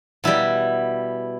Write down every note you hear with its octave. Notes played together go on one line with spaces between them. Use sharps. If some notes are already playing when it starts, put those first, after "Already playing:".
B2 G3 E4